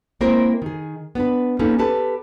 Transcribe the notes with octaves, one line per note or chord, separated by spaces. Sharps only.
G#3 A#3 C4 E4 A#4 C5
D#3 G#4
B3 D4 B4
A#3 C#4 D#4 A4 B4
G4 A4 B4 A5